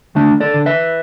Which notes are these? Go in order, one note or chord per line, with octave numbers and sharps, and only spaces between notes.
D2 A3 D4
A4 D5
D3
B4 E5